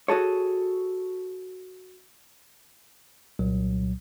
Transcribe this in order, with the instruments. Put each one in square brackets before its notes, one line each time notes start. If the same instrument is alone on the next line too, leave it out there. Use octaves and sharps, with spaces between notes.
[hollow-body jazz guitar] F#4 G#4 A4 C#5
[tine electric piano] C2 A#2 F#3